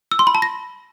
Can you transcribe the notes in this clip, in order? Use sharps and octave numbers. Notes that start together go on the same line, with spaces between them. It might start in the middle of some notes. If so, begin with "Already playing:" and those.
E6
C6
B5
A5
A#6